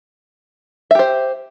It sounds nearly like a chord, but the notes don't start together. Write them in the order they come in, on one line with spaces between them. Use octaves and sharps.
E5 G4 C5